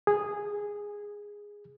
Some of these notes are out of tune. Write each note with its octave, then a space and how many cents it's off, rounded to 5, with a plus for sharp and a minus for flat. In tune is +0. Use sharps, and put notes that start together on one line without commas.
G#4 -10